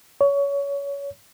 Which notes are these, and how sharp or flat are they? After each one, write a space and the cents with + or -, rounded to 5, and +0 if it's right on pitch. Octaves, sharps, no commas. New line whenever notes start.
C#5 +20